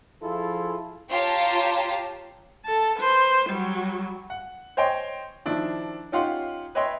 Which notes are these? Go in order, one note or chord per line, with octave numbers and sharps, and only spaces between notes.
F3 E4 F4 G#4 A4
F4 G4 C#5 F5 A5 A#5
A4 A5
B4 C5
F#3 G3
F#5
C5 C#5 D#5 G5 C6
D#3 F3 D4 E4
C#4 D#4 F4 G4 F#5 C6
B4 C#5 D#5 E5 G5 C6